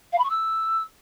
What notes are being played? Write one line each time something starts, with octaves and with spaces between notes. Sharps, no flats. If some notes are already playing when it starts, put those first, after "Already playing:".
F5
B5
C#6
E6